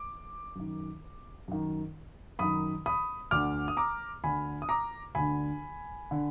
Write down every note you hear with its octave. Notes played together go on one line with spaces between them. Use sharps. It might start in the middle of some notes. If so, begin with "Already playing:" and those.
Already playing: D6
F#2 D#3
F#2 D#3
F#2 D#3 B5 D#6
B5 D#6
D2 D3 D6 F6
D#6
A#5 D6
D2 D3 G#5 B5
D#6
A#5 D6
D2 D3 G#5 B5
D3